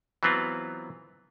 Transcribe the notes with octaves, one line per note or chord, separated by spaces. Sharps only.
E3 F#3 B3 C4 F4